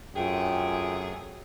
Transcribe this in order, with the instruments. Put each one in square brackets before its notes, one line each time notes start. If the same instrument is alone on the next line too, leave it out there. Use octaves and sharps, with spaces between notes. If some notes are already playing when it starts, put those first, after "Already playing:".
[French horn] F#2 [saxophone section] C3 A3 G#4 [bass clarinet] F4 [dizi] G5